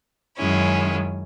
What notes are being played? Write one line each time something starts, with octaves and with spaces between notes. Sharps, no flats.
F#2 D#3 G#3 C#4 E4